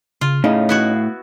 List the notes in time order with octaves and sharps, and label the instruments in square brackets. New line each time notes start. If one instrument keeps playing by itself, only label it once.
[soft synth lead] C#3 [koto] F4
[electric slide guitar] A2 [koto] C#3 [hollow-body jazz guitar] C#4 D#4 [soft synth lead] F5
[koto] B3 E4 F#4